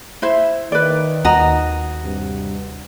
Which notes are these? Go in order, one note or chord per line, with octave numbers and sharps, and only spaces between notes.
E4 C5 E5
D#3 B4 D5
D#2 F#4 D#5 A#5
G2 C3